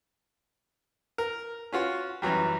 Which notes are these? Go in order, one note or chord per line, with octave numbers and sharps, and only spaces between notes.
A#4
C#4 F4 F#4
F#2 E3 F#3 G3